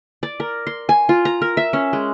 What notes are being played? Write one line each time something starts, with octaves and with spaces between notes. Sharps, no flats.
D5
A#4
C6
G#5
F4
A#5
A#4
E5
C#4
G#3